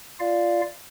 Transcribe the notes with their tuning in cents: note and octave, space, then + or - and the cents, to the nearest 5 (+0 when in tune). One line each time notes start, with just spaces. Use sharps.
F4 -15 D5 +0 F5 -5